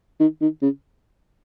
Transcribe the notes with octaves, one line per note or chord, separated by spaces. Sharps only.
D#3
D#3
C#3